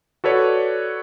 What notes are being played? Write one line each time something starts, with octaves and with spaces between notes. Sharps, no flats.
F#4 A4 B4 C#5 D5